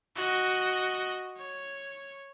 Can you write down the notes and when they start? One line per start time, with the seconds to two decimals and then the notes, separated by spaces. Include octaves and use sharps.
0.16 F#4 D#5
1.38 C#5